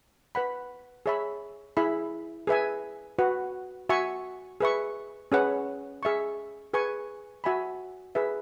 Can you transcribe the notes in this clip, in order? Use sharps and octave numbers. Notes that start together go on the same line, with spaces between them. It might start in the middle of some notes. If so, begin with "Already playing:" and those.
B4 F#5 B5
G#4 C#5 E5 B5
E4 G#4 E5 B5
G#4 B4 E5 G#5
F#4 B4 F#5
F#4 E5 G#5 C#6
G#4 B4 E5 C#6
C#4 G#4 B4 F#5
G#4 E5 C#6
G#4 B4 G#5 C#6
F#4 E5 G#5 B5
G#4 B4 E5